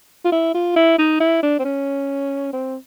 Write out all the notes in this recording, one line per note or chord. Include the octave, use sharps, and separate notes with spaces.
F4
E4
F4
E4
D#4
E4
D4
C4
C#4
C4